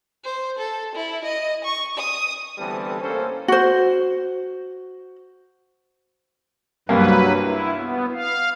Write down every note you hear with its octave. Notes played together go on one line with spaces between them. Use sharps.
C5
A4
E4
D#5
C#6
D#6
D2 E3 G3 B3 C4 A4
A1 A#3 C#4 A4 C5
F#4 C5
C2 G2 F#3 A#3 B4
E4
B3
F5